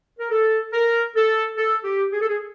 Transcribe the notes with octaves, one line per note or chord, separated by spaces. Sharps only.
A#4
A4
A#4
A4
A4
G4
G#4
A4
G#4